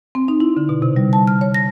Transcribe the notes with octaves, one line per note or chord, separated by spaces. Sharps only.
C4
D#4
E4
D3
B2
C3
G3
A5
F6
C#5
A#6